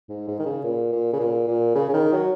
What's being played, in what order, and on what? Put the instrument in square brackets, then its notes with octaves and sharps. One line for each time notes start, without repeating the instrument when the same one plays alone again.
[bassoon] G#2
G#2
D#3
C#3
A#2
A#2
C#3
A#2
A#2
C#3
C#3
D#3
F#3